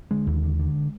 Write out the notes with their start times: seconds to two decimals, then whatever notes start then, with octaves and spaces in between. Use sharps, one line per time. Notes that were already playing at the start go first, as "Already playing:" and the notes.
0.11 D3 G#3
0.27 D#2
0.44 D3
0.60 D3